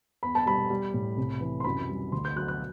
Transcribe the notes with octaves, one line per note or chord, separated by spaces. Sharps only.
E2 B5
A5
G3 B5
G3
A2
C2
E3
C6
F#2 B5
G3
D2 C6
G6
F#3 F#6
F#6